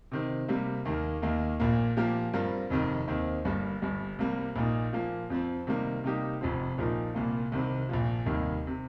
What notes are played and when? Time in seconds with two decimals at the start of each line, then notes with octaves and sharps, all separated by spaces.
0.12 C3 D#3 C4
0.48 C3 G3 A#3
0.85 D#2 D#3 A#3
1.22 D#2 D#3 A#3
1.60 A#1 A#2 A#3
1.97 A#2 F3 A#3 G4 A#4
2.33 G2 G3 C4 F4 A#4
2.70 F1 F2 C3 D#3
3.08 D#2 D#3 C4
3.45 G1 G2 G3 A#3
3.82 G1 G2 G3
4.18 C2 C3 G3 A#3
4.56 A#1 A#2 A#3 D#4
4.93 A#2 F3 A#3
5.30 F2 F3 C4
5.67 C3 D#3 G3 A#3
6.04 C3 G3 A#3 D#4 G4
6.41 F1 F2 C3 F3 C4
6.78 A#1 A#2 F3 D#4 A#4
7.14 C2 A#2 A#3 F4
7.52 C2 C3 D#3 C4
7.89 A#1 A#2 F3
8.26 F1 D#2 D#3 G3
8.67 C3